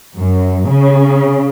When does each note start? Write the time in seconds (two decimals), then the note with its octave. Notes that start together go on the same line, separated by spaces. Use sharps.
0.18 F#2
0.68 C#3